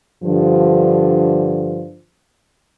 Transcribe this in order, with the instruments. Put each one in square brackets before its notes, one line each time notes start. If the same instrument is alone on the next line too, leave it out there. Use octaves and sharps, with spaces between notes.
[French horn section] G2 D3 F3